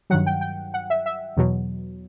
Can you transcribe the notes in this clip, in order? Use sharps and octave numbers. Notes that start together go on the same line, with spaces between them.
G2 D#3 F#3 F#5
G5
G5
F#5
E5
E5
E2 B2 F#3